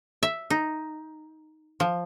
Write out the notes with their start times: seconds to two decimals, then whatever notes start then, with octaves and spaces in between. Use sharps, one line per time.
0.23 E5
0.50 D#4
1.80 F3